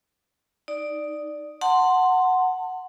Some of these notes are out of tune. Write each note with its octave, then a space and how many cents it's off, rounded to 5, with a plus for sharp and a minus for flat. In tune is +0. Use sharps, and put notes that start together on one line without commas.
D#4 +0 D5 +5
F#5 +0 A5 +35 C6 +0